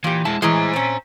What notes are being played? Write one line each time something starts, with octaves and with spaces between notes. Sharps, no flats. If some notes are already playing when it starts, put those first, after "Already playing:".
A#2 E3 G4
G#3 E4 A5
A2 E3 G#3 C5 A#5
C4 C#4